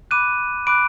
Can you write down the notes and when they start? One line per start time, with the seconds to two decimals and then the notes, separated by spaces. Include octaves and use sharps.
0.11 B5 D6 F#6 D#7
0.67 B5 D6 F#6 D7